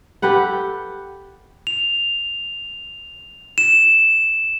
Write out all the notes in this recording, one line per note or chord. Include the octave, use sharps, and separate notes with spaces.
G4 A4 B4 F#5
F7
E7